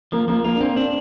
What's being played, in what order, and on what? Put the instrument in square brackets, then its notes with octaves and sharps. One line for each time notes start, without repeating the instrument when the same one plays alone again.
[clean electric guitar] F3 [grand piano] A#3
[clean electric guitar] F3 [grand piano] A#3
[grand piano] A#3 [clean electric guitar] F4
[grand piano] D4
[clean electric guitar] A#3 [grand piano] C4
[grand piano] C4 [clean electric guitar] D4